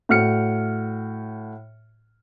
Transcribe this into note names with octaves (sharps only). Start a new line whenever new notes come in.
A2 F#4 F6 C#7